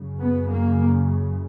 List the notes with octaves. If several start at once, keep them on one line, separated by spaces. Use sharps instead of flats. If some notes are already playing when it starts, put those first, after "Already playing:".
Already playing: F#2 C#3
B3
A#3